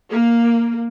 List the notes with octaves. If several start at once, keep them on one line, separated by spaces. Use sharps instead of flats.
A#3